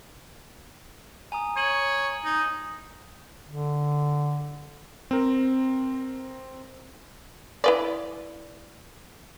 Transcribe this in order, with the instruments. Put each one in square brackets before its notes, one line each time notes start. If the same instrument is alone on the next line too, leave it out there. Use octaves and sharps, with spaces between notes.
[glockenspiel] G#5 A#5 D#6
[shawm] C#5 [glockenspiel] G#6 D#7 F#7
[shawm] D#4
[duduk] D3
[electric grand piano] C4 A#4
[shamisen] E4 B4 D5